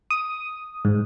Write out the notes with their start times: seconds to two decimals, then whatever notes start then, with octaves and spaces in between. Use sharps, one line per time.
0.10 D#6
0.85 G#2